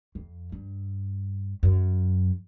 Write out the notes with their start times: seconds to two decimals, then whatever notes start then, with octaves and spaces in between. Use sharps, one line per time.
0.15 F2
0.52 G2
1.63 F#2